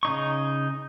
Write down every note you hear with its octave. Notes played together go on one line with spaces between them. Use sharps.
C#3 D#4 C#6